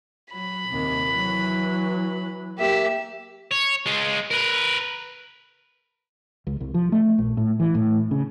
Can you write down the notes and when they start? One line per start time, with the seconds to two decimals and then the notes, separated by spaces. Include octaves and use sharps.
0.32 F#3 B5
0.69 D#2 C3
1.08 E3 F#3
2.58 A#3 G4 E5
3.51 C#5
3.86 G#3 F4
4.30 A#4 B4
6.47 C#2
6.60 C2
6.74 F3
6.92 A3
7.18 A#1
7.37 A2
7.60 E3
7.75 A2
8.11 C#3